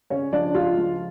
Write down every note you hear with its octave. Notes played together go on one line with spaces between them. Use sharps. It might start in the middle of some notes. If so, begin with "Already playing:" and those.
C#3 C#4 C#5
F3 D4 D5
C#2 F4 F5
F3